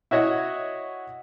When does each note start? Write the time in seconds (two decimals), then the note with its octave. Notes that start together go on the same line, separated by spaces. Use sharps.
0.11 E4 F#4 C#5 D#5 F#5